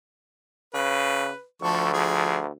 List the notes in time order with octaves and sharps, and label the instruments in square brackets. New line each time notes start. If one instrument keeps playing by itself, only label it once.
[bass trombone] C#3 [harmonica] B4
[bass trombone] D2 [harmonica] F3 A4 C#6
[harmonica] F3 G#4